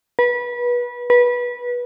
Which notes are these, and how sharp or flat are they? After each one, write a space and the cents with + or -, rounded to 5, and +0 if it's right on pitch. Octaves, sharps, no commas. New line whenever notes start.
B4 -25
B4 -20